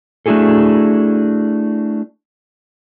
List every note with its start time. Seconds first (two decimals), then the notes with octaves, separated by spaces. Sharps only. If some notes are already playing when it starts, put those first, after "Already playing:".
0.26 A3 D4 E4 F#4 G#4 A4